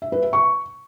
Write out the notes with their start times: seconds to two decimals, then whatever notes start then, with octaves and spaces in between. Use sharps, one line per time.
0.02 E5
0.12 B4
0.23 E5
0.33 C#6